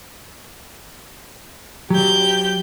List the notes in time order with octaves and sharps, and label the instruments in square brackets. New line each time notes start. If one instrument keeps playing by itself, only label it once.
[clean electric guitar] F#3 [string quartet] G4 G6